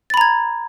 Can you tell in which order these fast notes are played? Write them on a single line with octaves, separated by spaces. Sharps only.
A6 B5 A#5 G#6